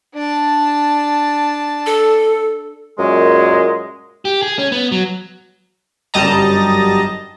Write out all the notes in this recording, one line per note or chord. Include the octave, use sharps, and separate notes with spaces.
D4 A5
A4
F#2 A#2 G#3
G4
G#4
C#4
B3
F#3
G1 F#2 G3 D#5 A5 A#5